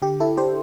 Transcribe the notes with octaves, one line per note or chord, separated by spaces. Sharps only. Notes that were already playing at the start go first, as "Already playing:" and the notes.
D3 G4
E4 A4
D4 G4 C5